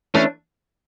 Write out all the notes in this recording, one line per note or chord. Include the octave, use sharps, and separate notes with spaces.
E3 A3 C#4 D4